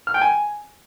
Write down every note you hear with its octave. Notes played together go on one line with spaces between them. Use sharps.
F6
G5
G#5